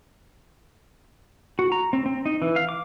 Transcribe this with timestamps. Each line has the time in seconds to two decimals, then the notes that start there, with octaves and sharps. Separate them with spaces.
1.59 F#4
1.72 A#5
1.93 C4
2.06 C4
2.26 D#4
2.42 E3
2.56 F5
2.69 D6